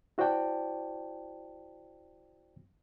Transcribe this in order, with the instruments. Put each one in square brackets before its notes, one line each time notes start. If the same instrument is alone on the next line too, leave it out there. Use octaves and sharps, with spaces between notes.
[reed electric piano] E4 F#4 C5 D5 G5 A5